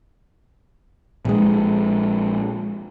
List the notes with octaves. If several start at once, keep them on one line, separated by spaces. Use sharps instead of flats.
A#1 G#3